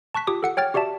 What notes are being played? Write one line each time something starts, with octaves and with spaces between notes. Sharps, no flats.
A5 C#6 F#6 B6
F4 G4 D6 D#6
A4 F#5 C#7
C#5 G5 F6 A6
F#4 G4 D5 E5 A5